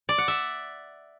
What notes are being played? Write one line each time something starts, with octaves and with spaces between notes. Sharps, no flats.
D5
F#5
E5